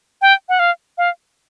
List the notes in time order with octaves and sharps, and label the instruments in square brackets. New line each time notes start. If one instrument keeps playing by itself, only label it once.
[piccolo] G5
F#5
F5
F5